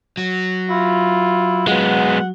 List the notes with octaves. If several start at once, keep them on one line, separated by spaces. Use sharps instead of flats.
F#3
E4 F4
G#3 B3 F#5